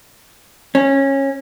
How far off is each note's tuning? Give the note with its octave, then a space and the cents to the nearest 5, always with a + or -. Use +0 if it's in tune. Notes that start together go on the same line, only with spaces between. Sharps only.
C#4 -20